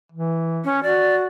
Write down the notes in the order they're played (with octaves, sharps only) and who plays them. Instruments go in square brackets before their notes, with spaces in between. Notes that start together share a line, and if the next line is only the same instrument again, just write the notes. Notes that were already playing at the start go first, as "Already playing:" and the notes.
[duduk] E3
[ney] C#4
[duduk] F#4 [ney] D5